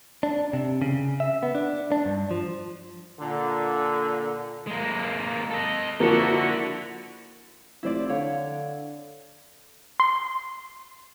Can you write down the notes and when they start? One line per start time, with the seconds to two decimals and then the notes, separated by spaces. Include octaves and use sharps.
0.23 D4
0.53 C3
0.82 C#3
1.20 E5
1.43 B3
1.55 D4
1.92 D4
2.05 G2
2.31 F3
3.20 A#2 D3
4.67 G#3 A#3
5.50 A4 D#5
6.00 D3 F3 A#3 E4 F#4
7.83 F1 E4 C5 D5
8.09 D3 C#5 F5
10.00 C6